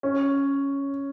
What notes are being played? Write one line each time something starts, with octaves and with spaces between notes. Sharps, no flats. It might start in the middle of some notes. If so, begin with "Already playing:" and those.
C#4